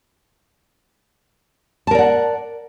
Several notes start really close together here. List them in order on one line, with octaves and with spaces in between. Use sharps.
A5 A#4 D5 F#5